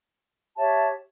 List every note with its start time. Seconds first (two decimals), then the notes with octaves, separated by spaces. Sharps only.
0.56 G4 C#5 E5 A5